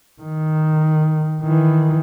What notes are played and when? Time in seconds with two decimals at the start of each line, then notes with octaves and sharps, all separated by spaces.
0.22 D#3
1.42 D#3 E3